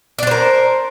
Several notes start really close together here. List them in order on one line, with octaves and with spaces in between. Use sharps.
D5 D4 C5 A#4